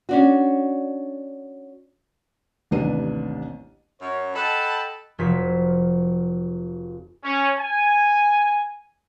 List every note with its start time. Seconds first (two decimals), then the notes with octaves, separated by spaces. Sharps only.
0.09 C#4 D4 F#4
2.71 A1 D#2 C3 D4 B4 D#7
4.01 F#2 C#5
4.35 A4 D#5 F#5 G5 A5 B5
5.18 F1 F3 F#3 B6
7.24 C#4
7.59 G#5